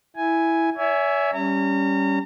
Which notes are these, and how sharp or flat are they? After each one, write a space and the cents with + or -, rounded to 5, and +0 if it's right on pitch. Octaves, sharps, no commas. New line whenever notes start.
E4 +0 G#5 +0
C#5 +40 E5 +0 G#5 +0
G3 +0 C#4 +5 A#5 -35